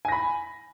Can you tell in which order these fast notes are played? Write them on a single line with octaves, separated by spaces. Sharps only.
G#5 A#6 B5